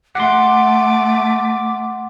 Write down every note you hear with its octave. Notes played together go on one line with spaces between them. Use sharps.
A3 F#5 C6 D6